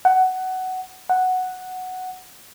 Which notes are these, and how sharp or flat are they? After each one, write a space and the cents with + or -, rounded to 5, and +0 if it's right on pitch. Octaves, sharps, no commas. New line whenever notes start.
F#5 +15
F#5 +0